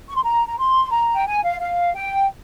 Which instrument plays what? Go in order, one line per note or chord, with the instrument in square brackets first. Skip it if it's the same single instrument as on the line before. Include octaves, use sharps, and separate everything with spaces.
[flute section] C#6
C6
A#5
A#5
C6
A#5
G5
G#5
F5
F5
G5